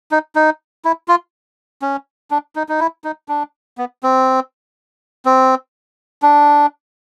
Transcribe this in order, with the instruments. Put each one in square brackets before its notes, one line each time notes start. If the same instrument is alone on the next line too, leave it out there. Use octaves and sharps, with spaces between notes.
[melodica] D#4
D#4
E4
F4
C#4
D4
D#4
D#4
E4
D#4
D4
B3
C4
C4
D4